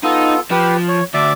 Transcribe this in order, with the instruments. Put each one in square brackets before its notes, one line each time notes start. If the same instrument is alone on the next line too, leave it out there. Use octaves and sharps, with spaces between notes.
[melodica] B3 F4 A4 [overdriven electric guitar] D#4
[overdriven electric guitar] F3 [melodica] G4 B4
[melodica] C#5
[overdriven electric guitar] D2 [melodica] D5 E5 D6